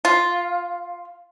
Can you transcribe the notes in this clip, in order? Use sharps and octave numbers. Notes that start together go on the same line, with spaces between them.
F4